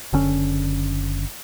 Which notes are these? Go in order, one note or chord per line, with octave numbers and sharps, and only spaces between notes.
F#1 D3 C#4